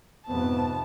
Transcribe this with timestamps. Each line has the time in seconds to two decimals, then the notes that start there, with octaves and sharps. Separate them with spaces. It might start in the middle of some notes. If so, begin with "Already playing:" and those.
0.27 F2 G#2 C3 B3 A5